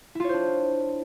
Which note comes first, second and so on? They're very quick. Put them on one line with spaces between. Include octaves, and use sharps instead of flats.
E4 F4 C#5 C5 D4